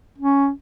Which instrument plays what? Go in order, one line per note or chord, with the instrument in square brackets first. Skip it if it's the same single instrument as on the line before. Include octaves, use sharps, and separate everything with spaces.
[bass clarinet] C#4